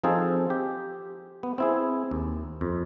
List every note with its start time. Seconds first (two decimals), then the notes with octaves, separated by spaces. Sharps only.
0.03 F3 C4 D#4 F4 G#4 A4
0.50 G4
1.43 B3
1.58 C4 E4 G#4
2.11 D#2
2.61 F2